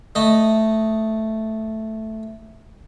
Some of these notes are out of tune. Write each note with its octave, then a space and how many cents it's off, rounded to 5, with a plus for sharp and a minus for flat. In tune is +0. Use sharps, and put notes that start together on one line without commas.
A3 +0 D#5 +0